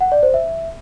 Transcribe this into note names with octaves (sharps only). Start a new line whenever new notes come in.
F#5
D5
C5
E5